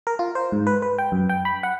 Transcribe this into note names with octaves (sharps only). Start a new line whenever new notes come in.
A#4
F4
C5
G#2
B4
B4
G5
F#2
G5
B5
F#5